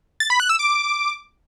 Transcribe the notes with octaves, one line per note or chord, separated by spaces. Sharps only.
A6
B5
F#6
E6
D6